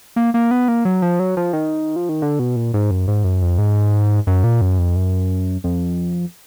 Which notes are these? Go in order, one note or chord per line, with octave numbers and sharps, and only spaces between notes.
A#3
A#3
B3
A#3
F#3
F3
F#3
F3
D#3
F3
D#3
D3
B2
A#2
G#2
F#2
G#2
F#2
F2
G#2
F#2
A#2
F#2
F2
F#2
F2